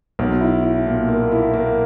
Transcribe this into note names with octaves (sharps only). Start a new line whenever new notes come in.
B1
E4
E4
A#2
A#3
E4
A#3